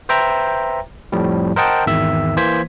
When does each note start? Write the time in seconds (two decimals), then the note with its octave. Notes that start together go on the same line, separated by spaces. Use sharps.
0.09 B4 C5 E5 G5 A#5
1.12 F2 A2 F3 G3
1.56 A#4 C5 D#5 F#5 G5 A5
1.86 G#1 E2 D#3 E5 E6
2.36 E3 A#3 C5 G#6 B6